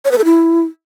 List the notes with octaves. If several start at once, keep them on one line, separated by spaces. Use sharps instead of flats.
C#5
B4
A4
E4